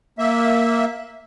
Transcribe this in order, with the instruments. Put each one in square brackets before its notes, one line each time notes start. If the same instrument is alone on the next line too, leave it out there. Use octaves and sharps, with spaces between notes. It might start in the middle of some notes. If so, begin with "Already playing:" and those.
[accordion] A#3 E5